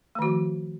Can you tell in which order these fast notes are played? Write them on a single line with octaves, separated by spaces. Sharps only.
A3 D#3 F#4 F3